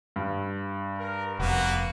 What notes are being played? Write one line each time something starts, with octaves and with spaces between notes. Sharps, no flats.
G2
A#4
F1 A#3 B3 F#4